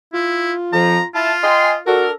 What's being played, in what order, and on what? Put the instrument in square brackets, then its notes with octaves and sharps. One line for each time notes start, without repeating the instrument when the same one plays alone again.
[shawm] E4 [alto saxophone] F4
[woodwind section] F2 F3 [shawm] A#5
[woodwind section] E4 A5 [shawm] F4
[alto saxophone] D#5 [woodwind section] G5 G#5 C6
[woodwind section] D4 A4 A#4 [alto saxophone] F#4